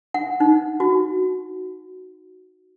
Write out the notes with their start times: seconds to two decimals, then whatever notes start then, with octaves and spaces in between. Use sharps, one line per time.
0.14 F#5
0.40 D#4
0.80 F#4